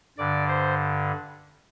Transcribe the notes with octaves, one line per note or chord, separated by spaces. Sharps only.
G2 D3 D5
C5